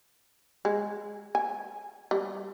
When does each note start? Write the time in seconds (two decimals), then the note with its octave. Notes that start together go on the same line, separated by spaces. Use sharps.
0.65 G#3
1.35 G#5
2.11 G3